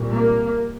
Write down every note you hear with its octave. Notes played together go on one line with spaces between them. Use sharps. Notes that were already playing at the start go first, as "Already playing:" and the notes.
Already playing: C2 A#2
A#3